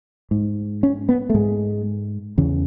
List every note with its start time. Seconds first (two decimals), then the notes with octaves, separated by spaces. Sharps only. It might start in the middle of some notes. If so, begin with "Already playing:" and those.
0.31 G#2
0.83 C#4
1.09 B3
1.30 A3
1.34 G#2 G#3
2.38 E2 C#3